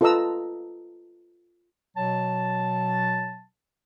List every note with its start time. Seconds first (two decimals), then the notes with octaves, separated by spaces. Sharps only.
0.01 F4 A4 B4 D#5 A#5 E6
1.97 B2 F#3 A5